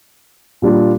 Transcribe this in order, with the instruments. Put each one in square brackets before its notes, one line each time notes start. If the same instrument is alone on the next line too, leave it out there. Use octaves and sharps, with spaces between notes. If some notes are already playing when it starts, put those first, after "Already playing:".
[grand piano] A#2 G3 D4 F4